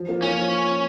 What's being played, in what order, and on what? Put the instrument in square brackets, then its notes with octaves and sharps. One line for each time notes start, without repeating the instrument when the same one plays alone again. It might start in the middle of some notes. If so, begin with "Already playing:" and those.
Already playing: [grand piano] F3
A#3 F4
[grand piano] F3 [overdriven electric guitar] C#4